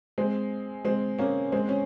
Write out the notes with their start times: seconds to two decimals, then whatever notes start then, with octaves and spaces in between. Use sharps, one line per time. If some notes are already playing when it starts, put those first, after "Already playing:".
0.18 G#3 C4
0.85 G#3 C4
1.19 A#3 C#4
1.52 G#3 C4
1.69 C#4